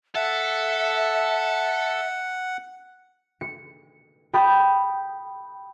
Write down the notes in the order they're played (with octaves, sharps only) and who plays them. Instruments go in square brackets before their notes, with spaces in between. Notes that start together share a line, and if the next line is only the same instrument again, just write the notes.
[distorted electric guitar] A4 [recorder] E5 [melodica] F#5
[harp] C#7
G5 B5 D#6 G6 A6